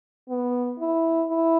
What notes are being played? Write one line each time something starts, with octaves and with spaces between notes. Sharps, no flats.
B3
E4
E4